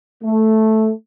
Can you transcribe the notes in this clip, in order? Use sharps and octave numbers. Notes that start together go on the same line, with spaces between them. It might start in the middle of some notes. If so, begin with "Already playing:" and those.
A3